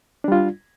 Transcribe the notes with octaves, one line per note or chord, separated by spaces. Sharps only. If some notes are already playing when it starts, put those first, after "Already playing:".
G3 D4 F4